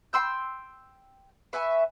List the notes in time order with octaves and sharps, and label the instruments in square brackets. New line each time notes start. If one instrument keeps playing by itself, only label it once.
[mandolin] G5 C6 E6 G6
B4 E5 G#5 C#6